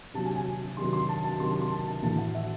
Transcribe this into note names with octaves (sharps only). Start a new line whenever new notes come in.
C3 F#3 A5
G#5
G#5
C3 D#3 F#3 C6
C6
A5
A5
C3 D#3 F#3 C6
A5
C6
A5
A5
A2 E3 A5
F#5
E5